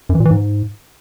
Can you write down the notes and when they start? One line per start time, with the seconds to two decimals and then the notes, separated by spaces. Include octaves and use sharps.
0.09 F#2
0.15 E3
0.20 A#2
0.25 E3
0.31 G#2